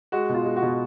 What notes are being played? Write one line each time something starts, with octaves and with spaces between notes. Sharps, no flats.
G#3 F#4
B2 F4
G#3
F#4
B2